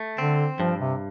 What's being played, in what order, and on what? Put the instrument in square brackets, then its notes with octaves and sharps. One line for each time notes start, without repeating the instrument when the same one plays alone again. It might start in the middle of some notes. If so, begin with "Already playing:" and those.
Already playing: [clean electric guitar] A3
[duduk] D3 [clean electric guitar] C4
[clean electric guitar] G2 [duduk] F3
[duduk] C3